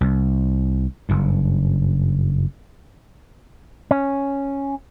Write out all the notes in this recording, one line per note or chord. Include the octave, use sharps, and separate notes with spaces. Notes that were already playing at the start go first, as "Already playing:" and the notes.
C2
F#1 G2
C#4